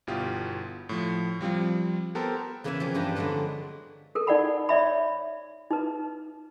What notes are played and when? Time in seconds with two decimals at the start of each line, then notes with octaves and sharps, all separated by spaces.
0.07 G1 B2 E4 F4 G4
0.89 A2 F3
1.41 F3 G3 C4 F4
2.15 B3 G4 A4 A#4 C5
2.64 E2 C#3 A#3 B4 E5 G#5
2.80 F3 A#3 C4
2.94 G2 E3 G3 D4 G4 A#5
3.16 D3 F3 F#3 G#3 D4 B4
4.15 A4 A#4
4.27 D#4 D5 F#5 B5
4.69 C#5 D5 E5 B5
5.71 D#4 B4